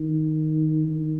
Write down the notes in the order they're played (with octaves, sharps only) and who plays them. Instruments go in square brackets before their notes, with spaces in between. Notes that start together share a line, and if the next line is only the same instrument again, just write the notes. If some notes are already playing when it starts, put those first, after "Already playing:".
Already playing: [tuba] D#3
D#3